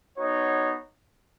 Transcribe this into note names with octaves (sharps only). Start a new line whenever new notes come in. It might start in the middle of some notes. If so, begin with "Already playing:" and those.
B3 D#4 F#4 C#5